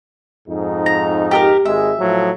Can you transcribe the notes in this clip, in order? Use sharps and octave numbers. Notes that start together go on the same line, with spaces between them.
F2 G#2 D#4
A#5
G4 A4 A#4
G#1 G#3 E5
A2 F3 F#3